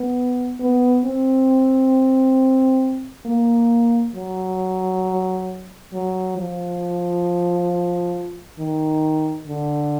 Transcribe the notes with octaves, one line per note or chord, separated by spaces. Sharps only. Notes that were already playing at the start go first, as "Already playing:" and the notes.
Already playing: B3
B3
C4
A#3
F#3
F#3
F3
D#3
D3